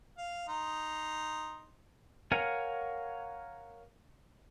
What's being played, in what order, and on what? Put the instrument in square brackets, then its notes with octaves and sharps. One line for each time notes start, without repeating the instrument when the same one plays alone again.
[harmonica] F5
D#4 C6
[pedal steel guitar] A#4 C#5 F5 F#5 G#5